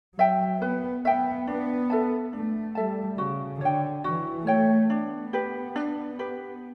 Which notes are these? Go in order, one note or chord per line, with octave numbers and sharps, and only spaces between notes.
F#3 E5 G5
B3 B4
B3 E5 G5
B3 D4
A4 E5 A5
A3 D4
G3 A4 E5 A5
C#3 F#4
D3 C#5 G5
E3 F#4
A3 C#5 G5
B3 D4
G4 B4
D4
G4 B4